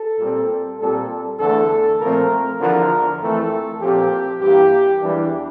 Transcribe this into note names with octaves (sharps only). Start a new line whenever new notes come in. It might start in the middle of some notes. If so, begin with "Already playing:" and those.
Already playing: A4
A#2 G3 C4
A#2 G3 C4 A4
E2 D3 A3 A4
A#2 F3 A3 C4 A#4
E2 D3 F3 A#4
F2 E3 A3 C4 A4
A#2 F3 C4 G4
G2 E3 A#3 G4
E2 E3 G3 D4